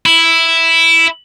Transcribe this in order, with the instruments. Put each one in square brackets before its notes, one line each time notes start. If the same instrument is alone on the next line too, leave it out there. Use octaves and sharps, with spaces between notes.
[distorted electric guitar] E4